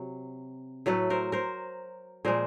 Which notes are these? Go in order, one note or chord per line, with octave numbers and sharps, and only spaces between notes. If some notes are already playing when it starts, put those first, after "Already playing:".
Already playing: C3 F#3
A2 F#3 A3 A4 B4
A#4 C5
A#4 C5
A#2 F3 G#3 A#4 C5